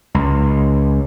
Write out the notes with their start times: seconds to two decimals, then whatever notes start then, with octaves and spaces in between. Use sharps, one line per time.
0.14 C#2